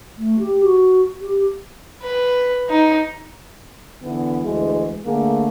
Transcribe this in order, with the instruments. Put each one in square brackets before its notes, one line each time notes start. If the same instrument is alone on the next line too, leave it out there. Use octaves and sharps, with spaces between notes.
[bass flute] A3
G4
F#4
G4
[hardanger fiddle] B4
D#4
[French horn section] D3 E3 B3
D2 E3 G#3
D3 A3 A#3 G#4